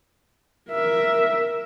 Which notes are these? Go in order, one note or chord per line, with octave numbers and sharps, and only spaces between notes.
A#4 E5